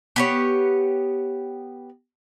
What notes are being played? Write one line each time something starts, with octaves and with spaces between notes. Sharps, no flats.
B3 G4 C#5